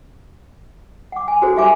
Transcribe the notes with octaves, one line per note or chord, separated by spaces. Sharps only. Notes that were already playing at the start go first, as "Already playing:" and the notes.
F#5 D6
G#5
F#4 G#4 A4 C5
D#4 G4 E5 F5 G#5 D6